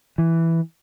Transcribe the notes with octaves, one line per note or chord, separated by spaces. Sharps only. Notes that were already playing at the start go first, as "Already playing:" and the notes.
E3